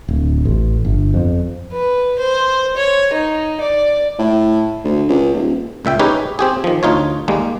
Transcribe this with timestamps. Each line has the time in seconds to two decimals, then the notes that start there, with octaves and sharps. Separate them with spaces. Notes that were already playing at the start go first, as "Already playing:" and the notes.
0.08 D1
0.45 A1
0.85 G1
1.14 F2
1.71 B4
2.18 C5
2.76 C#5
3.13 D#4
3.60 D5
4.19 A2
4.84 D2
5.09 C#2
5.34 D#1
5.85 C#2 A#2 E5 G5
5.99 C#4 D#4 G4 G#4 B4
6.39 C4 G4 G#4
6.64 D#3 F3
6.83 D2 D#4 F4 C#5
7.28 D#2 G3 G#3 A#3